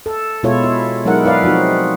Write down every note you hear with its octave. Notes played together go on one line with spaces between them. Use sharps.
A4
B2 G#3 E4 F4 A4 C#5
E4
F#3 G#3 D#4 E4 A#4 F#5
E4 B4 D5 F5
F3 C4 D#4 F#4